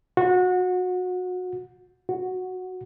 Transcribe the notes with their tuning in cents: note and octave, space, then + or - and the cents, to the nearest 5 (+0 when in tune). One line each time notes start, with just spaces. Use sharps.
F#4 -25
F#4 -5